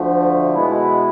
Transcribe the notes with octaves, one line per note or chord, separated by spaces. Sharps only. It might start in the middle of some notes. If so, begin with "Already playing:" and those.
Already playing: D2 D3 F3 A3
B2 G#3 B3 E4